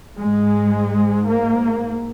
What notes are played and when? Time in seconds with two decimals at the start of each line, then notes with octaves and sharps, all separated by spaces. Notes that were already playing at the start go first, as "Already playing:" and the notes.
0.18 G#2 G#3
1.29 A#3